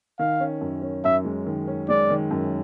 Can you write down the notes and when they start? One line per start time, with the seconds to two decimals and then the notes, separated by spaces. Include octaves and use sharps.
0.19 D#3 F5
0.40 C#4
0.61 F#2
0.82 C#4
1.04 F#2 E5
1.25 G#3
1.46 D#3
1.68 C#4
1.89 G#3 D5
2.10 D#3
2.31 F#2